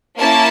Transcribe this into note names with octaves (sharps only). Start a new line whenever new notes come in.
A#3 C#4 E4 A5